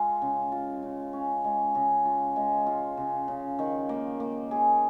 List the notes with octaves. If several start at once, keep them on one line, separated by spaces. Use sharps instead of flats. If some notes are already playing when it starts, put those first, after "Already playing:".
Already playing: G#3 F4
C#3
F4
C#3
C#4
G#3
C#3
F4
G#3
F4
C#3
C#3
D#3
A#3
A#3
G#4